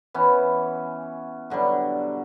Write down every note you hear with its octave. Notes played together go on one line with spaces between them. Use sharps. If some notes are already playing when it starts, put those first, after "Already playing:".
E3 B3 C#4
B2 D3 F#3 G3